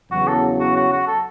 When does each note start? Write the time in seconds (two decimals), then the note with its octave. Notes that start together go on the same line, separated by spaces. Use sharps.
0.11 E2 C#3 F#3 F#4
0.27 A4
0.60 F#4
0.76 F#4
0.92 F#4
1.07 A4